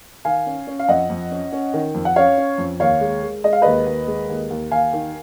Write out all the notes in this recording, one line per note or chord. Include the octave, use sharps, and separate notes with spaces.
D#3 F5 G#5
C#4
C#4
F5
F2 D#5 F#5
F2
C#4
C#4
D#3
F2
F#5
C#4 C#5 F5
C#4
F2
D#2 C#5 F5
G#3
G#3
G#3 D#5
F5
D#2 B4 D#5
D#2
G#3
D#2
D#2
D#2 F5 G#5
D#3